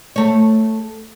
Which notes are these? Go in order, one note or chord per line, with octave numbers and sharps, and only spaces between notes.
A3 C#5